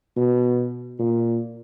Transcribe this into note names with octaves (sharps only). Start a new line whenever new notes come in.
B2
A#2